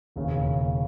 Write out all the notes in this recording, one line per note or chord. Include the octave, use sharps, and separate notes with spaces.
E1 D#2 C#3